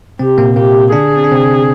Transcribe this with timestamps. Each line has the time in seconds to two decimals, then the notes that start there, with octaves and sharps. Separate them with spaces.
0.19 C3 C4 G4
0.38 A#2 A#3
0.56 A#2 A#3 G4
0.92 D3 D4 G#4
1.17 C4
1.24 D4
1.32 C3 C4